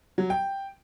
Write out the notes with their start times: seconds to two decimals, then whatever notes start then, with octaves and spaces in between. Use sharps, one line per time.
0.18 F#3
0.30 G5